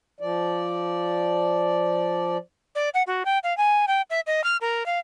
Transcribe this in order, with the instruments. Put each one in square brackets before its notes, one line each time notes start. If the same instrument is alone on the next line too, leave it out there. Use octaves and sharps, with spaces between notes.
[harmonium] F3 D5
[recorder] D5
F#5
F#4
G5
F5
G#5
G5
E5
D#5
F6
A#4
F5